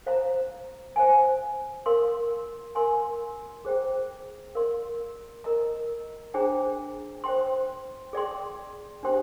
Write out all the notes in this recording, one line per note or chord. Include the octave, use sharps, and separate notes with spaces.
C5 F5 A#5
C5 F5 G#5
A#4 F5 C6
A#4 F5 G#5 C6
G#4 C5 G5 A#5
A#4 D5 F5 C6
A#4 D#5 A#5
D4 G#4 C5 G5 A#5
C5 G5 C6
G#4 D5 G5 C6
D4 G4 C5 G5 C6